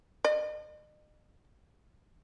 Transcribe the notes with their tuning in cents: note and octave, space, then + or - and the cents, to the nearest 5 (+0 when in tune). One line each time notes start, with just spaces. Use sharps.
D#5 -40